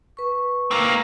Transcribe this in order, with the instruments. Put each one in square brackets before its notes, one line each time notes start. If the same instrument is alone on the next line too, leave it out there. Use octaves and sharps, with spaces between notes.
[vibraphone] B4 C#6
[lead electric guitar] A#3 C4